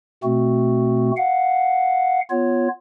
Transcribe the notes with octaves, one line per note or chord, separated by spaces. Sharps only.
B2 A3 C4 F#4
F5 F#5
B3 F4 C#5